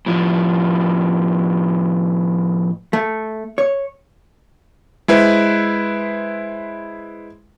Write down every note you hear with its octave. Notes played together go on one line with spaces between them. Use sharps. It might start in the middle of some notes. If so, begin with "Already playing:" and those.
A2 F3
A3
C#5
G#3 E4 B4 C5